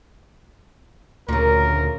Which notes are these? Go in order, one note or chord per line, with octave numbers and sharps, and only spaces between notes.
D2 A#2 C#3 A#4